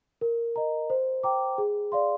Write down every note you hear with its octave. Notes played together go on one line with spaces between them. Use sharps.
A#4
D#5 A#5
C5
G5 A#5 D6
G#4
D5 F5 C6